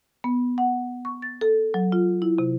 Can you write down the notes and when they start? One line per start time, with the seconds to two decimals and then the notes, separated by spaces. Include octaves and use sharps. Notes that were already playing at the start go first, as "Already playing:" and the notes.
0.24 B3
0.58 F#5
1.05 C#6
1.22 A6
1.41 A4
1.74 F#3
1.92 F4
2.22 E4
2.38 C3